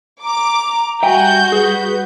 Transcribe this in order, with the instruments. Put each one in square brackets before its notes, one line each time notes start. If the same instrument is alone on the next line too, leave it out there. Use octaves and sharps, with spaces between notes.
[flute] A#5 [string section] D6
[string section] G3 F#4 G6 [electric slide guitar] E5 G5 G#5
[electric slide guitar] G#4 [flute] B4